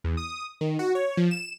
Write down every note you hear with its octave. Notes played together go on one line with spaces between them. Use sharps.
E2
D#6
D#3
F#4
C#5
F3
E7